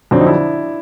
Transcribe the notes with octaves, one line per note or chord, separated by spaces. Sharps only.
F2 D3 F#3 C4 D4
D#4
D4 E4